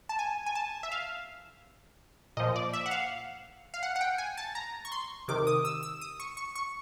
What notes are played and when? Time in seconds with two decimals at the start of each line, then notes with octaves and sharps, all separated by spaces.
0.09 A5
0.19 G#5
0.46 G#5
0.55 A5
0.83 E5
0.92 F5
2.37 A#2 F3 D#5
2.56 D5
2.73 E5
2.86 F#5
2.91 F5
3.74 F5
3.83 F#5
3.96 F#5
4.01 G5
4.18 G#5
4.37 A5
4.55 A#5
4.85 C#6
4.92 C6
5.28 C3 D#3 D6
5.47 D#6
5.65 E6
5.83 E6
6.01 D#6
6.20 C#6
6.37 C#6
6.55 C#6